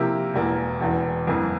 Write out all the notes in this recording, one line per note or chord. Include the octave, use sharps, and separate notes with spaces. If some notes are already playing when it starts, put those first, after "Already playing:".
Already playing: C3 F3 A#3 E4 G4
E1 E2 E3 A#3
E1 E2 E3
G1 F2 E3 A#3